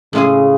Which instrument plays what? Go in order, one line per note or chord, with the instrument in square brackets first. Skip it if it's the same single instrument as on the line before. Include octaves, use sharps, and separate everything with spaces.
[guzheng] A2 G#3 C#4 G#4 [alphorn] C#3